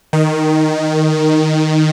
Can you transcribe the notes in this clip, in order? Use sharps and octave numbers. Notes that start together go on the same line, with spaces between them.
D#3